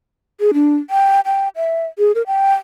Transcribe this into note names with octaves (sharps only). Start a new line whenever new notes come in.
G#4
D4
G5
G5
E5
G#4
A#4
G5